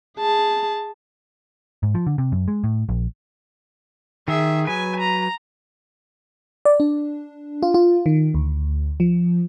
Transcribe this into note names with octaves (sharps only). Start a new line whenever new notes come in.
G#4 A5
G#2
F3
D3
C3
F#2
G#3
A2
A#1
D#3 G#4 E5
F#3 B4 G#5
A#5
D5
D4
F4
F4
D#3
D2
F3